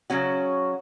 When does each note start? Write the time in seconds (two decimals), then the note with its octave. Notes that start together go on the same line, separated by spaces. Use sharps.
0.10 C#3 F#3 C#4 F#4